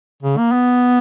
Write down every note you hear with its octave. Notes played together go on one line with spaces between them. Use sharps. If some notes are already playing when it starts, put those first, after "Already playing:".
C#3
A#3
B3